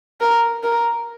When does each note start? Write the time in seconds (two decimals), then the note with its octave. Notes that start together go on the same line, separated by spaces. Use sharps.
0.20 A#4
0.63 A#4